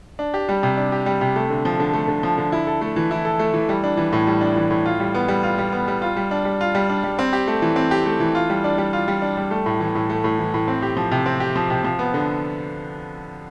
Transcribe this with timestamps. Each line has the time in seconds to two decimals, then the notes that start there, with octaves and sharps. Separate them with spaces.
0.19 D4
0.34 G4
0.49 G3
0.63 C3
0.77 D4
0.92 G4
1.06 G3
1.21 C3
1.36 A3
1.50 D3
1.65 F3
1.80 D3
1.93 A3
2.08 D3
2.23 F3
2.38 D3
2.52 E4
2.67 A4
2.81 A3
2.96 E3
3.11 E4
3.25 A4
3.39 A3
3.54 E3
3.69 G3
3.84 D4
3.97 E3
4.12 A2
4.27 G3
4.41 D4
4.56 E3
4.70 A2
4.86 F4
5.00 G3
5.14 B3
5.28 G3
5.43 F4
5.58 G3
5.72 B3
5.88 G3
6.02 F4
6.17 G3
6.31 D4
6.45 G3
6.61 F4
6.75 G3
6.89 D4
7.04 G3
7.19 C4
7.33 G4
7.47 A3
7.62 E3
7.76 C4
7.91 G4
8.06 A3
8.20 E3
8.35 F4
8.50 G3
8.64 D4
8.78 G3
8.93 F4
9.08 G3
9.22 D4
9.37 G3
9.51 A3
9.66 A2
9.80 E3
9.95 A2
10.10 A3
10.24 A2
10.39 E3
10.54 A2
10.68 C4
10.82 G4
10.97 F3
11.12 C3
11.26 C4
11.40 G4
11.56 F3
11.70 C3
11.84 F3
11.99 B3
12.14 D3